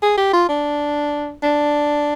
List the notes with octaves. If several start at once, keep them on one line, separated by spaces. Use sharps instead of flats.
G#4
G4
F4
D4
D4